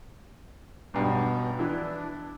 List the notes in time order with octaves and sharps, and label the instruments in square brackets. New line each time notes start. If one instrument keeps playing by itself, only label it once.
[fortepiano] B1 G2 [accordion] B2 B3
[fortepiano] E3 E4 [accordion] D4